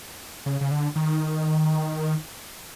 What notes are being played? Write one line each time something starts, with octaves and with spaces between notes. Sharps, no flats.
C#3
C#3
D3
D#3